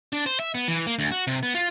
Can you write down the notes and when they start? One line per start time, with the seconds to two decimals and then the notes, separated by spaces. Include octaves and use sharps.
0.13 D4
0.26 C5
0.40 E5
0.55 B3
0.68 E3
0.87 A#3
0.99 D2
1.11 F#4
1.27 C3
1.43 B3
1.55 F4